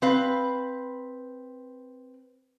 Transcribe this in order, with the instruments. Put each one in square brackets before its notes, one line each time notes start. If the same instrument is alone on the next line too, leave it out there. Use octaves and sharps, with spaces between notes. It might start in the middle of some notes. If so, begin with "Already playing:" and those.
[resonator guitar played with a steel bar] C4 B4 F5